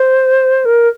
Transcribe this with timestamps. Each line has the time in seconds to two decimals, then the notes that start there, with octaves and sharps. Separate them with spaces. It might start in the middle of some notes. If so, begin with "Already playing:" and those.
Already playing: C5
0.65 A#4